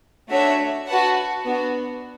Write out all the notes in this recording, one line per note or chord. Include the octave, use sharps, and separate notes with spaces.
A3 D4 F#4 C#5 E5
F#4 B4 F#5 A5
B3 D4 F#4